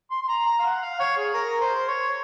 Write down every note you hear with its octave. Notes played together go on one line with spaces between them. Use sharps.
C6
C6
A#5
A#5
F5
F#5
F5
C#5
G#4
A#4
C5
C#5